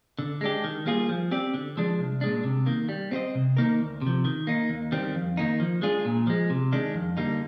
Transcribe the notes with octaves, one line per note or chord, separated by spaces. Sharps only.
D3
G#3 D4 G4
D#3
G3 A#3 F4 G#4
F3
C4 G4 D5
D3
F3 G#3 D4
C2
A#2 G#3 D4
C3
D#3 A#3
G3
C4 F4 C5 D#5
C3
D#3 A#3 D#4 A#4
D2
C3 F3
D#3
A#3 D#4
D#2
D#3 G3 C4
F2
D#3 A#3 D#4
F3
G#3 D4 F4 G#4
A#2
F3 G#3
C3
D#3 G#3 D4
F2
D3 G3 A#3 D#4